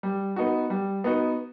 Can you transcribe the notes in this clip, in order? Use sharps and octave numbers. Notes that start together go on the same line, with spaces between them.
G3
B3 D#4 F#4
G3
B3 D#4 F#4